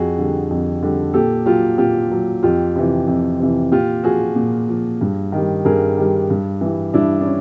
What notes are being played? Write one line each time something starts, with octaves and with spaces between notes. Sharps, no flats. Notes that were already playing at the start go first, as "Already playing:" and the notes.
Already playing: F2 F#4 G#4
D3 G3
F2
D3 G3
A#2 G4 A4
F#3 F4 G4
A#2 F4 G4
F#3
F2 F4 G4
C3 E3
F2
C3 E3
A#2 F4 G4
F3 F#4 G#4
A#2
F3
G2
D#3
G3
G2 G#4 A#4
D#3 G3
G2
E3 G3
G2 D4 E4
D4
C#4